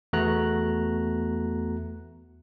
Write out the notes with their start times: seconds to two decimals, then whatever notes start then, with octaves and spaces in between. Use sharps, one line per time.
0.13 E2 A3 B3 F#4 A#5 F#6